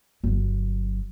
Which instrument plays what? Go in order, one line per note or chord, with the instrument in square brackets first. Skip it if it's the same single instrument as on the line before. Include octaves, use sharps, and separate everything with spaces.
[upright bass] G1 F#3